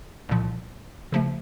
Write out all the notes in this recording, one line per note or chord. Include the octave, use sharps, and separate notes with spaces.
C2 A#2 F3
C#3 F3 A3